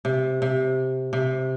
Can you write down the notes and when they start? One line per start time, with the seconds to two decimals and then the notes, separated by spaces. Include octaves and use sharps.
0.05 C3
0.42 C3
1.13 C3